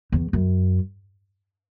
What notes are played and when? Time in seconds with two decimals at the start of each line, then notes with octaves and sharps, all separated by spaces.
0.12 E2
0.33 F#2